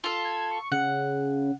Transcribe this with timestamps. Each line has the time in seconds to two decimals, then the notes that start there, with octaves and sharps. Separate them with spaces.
0.04 F4 A4
0.25 G#6
0.51 C#6
0.72 C#3 F#5